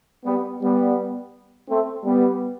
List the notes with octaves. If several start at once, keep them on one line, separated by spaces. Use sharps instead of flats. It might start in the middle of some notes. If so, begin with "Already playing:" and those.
G3 B3
G3 B3
A3 C4
G3 B3